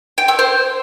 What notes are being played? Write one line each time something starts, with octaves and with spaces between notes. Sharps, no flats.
G5
E6
C5